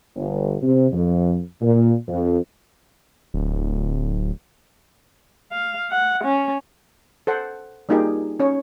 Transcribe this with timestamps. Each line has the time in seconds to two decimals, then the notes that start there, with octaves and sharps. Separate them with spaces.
0.16 G1
0.62 C3
0.92 F2
1.61 A#2
2.08 F2
3.34 D1
5.52 F5
5.91 F#5
6.24 C#4
7.27 A4 C5 F#5
7.89 G3 A#3 D#4 F4 G4 G#4
8.40 C#4 C#5